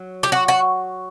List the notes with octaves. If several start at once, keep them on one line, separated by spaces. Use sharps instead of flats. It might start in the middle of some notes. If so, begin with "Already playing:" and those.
Already playing: F#3
G4
F#4
F#4